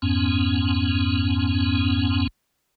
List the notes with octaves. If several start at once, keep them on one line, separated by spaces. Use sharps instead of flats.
F2 G#2 B3 C#4